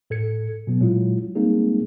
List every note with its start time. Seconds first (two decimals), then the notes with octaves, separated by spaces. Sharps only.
0.10 A2 A4 G#6 C#7
0.67 B2 F#3 B3
0.80 A#2 F#3 G#3 D4 E4 F4
1.35 G3 G#3 A#3 C4 D#4 G#4